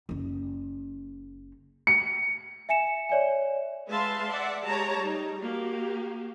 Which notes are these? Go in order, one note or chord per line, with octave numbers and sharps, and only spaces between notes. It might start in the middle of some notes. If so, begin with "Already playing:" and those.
F#1 C#4
C#7
E5 G#5 C#7 E7
C#5 D5 E5 G#5
G#3 B4 E5 F5 A5 C6
D5 E5 F#5
G#3 A3 G4 C#5 A5 A#5
G3 D#4
A#3 F#4 G4